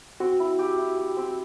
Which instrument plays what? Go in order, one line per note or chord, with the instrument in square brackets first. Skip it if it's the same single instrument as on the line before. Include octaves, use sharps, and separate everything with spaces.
[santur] C4 [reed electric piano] F#4
[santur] E4
G4
E4
G4
C4